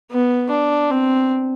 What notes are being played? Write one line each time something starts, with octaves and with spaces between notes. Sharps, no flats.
B3
D4
C4